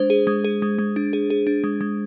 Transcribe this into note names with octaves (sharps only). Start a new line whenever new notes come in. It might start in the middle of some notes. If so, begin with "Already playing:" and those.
Already playing: G#3 D4 C5
G#4
G#3
G#4
G#3
G#3
D4
G#4
G#4
D4
G#3
G#3